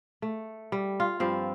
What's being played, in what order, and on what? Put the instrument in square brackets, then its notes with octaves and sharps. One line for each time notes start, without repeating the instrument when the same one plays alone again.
[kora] A3
G3
F4
G2 F3 C4 F5